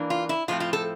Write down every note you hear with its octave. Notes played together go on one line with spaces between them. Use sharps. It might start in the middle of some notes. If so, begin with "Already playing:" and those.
Already playing: E3 A#3 D4
F4
E4
A2 F3 A3 C4 F4
F4
A4